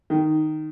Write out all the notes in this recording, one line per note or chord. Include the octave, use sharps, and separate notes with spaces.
D#3